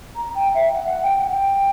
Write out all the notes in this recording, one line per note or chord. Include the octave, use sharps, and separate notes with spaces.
A#5
G5
E5
F#5
F#5
G5
F#5
G5